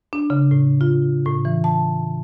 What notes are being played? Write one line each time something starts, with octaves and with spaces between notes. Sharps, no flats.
D4
C#3
A2
F4
A2
E3
A5